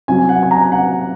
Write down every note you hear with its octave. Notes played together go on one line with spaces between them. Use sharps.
C3 F#3 G#5
F#5
G#5
A#5
F#5